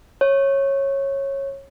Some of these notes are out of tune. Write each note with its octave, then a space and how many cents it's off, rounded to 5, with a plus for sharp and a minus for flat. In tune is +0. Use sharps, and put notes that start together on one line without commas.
C#5 -15